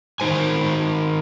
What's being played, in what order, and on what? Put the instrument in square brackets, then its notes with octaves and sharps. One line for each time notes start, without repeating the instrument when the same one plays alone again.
[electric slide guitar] D#3 D#4 C5 G#5